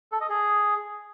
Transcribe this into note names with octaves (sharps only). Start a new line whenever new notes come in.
A4
D#5
G#4